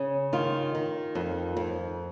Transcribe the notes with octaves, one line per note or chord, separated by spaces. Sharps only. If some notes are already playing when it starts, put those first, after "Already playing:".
Already playing: C#3
D#3 F4
D#3
F2
F2